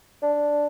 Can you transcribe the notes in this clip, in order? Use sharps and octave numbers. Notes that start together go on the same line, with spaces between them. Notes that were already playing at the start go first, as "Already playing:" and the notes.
D4